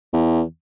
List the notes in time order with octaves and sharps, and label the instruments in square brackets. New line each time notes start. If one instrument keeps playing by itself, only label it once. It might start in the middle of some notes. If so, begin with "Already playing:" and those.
[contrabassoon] E2